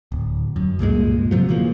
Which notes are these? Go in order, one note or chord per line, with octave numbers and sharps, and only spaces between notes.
D1
F#2
C#2 G2 A#2 G#3
C3 F3 F#3
C#3 E3 F3 A#3